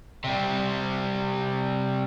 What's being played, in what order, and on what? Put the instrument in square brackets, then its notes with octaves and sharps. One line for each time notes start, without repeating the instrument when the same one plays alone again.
[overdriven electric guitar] C3 G3